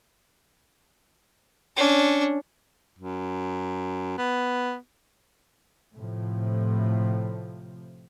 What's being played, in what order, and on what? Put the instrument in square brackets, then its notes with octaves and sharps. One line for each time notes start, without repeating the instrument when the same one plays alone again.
[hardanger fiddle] C#4 D4
[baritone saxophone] F#2
B3
[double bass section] A2 C3 F3